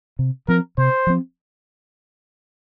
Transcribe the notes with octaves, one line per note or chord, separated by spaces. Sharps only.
C3
F3 C4 A#4
C3 C5
F3 C4